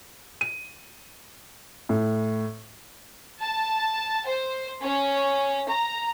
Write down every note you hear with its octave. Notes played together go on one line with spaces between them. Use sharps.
D#7
A2
A5
C5
C#4
A#5